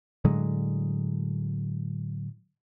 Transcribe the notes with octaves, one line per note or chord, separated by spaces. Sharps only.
A2 D3 F#3 G#3